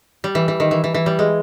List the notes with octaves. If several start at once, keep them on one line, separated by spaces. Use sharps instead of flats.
G3
E3
E3
D#3
E3
E3
E3
G3
G#3